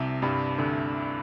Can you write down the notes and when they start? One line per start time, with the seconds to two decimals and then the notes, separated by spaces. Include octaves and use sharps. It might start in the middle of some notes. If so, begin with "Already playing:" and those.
Already playing: C2 C3
0.22 G2 G3
0.58 D2 D3